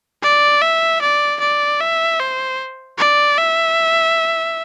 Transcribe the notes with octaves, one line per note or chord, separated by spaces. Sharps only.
D5
E5
D5
D5
E5
C5
D5
E5